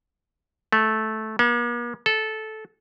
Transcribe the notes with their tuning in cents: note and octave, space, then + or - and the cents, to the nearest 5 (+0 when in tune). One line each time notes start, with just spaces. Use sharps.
A3 -10
A#3 +45
A4 -15